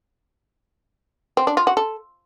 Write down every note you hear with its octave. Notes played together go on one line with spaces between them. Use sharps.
C4
D4
F4
F#4
A4